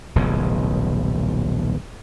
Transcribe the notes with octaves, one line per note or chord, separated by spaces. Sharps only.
D#1 B1 A2 C#3